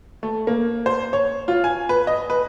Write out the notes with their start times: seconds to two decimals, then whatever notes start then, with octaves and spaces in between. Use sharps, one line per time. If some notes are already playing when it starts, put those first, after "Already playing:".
0.23 A3
0.47 A#3
0.86 C5
1.13 C#5
1.48 F4
1.64 G#5
1.89 B4
2.07 D#5
2.30 B4